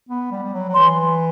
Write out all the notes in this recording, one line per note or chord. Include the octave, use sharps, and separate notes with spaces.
B3
G3
G3
F#3
F#3
E3 C6